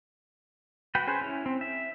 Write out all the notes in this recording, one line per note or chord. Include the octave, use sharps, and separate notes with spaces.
F#4 B4 G5
C#4 G#4 B4 C5
C#4 E4
C4
E5